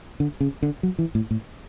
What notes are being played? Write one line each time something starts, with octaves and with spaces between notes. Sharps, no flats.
D3
C#3
D3
F#3
E3
A2
A2